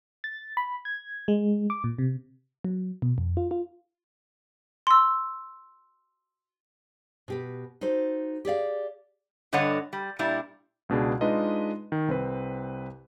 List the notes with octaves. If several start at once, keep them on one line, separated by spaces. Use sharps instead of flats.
A6
B5
G#6
G#3
D6
A#2
C3
F#3
B2
F2
F4
F4
C6 E6
B2 G4 B4
D#4 F#4 A4 C5
G4 G#4 D5 F5
G2 D3 G3 C#5 D#5 F#5
G3
A#2 G3 D4 E4
C#2 B2 D4 G#4
G#3 D4 D#4 F4 B4 D#5
D#3
C2 C4 B4